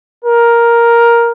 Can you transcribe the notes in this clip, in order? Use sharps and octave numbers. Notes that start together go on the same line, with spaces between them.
A#4